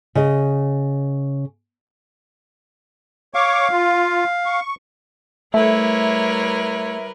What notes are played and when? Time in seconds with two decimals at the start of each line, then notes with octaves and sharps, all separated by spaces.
0.15 C#3 D#5
3.34 C#5 F5 C#6 D6
3.71 F4
4.46 C#6
5.54 G3 A3 E4 A#4 B4 C#5 E5